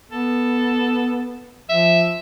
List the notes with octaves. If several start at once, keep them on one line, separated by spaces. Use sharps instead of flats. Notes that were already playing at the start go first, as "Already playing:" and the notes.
B3 A4
F3 E5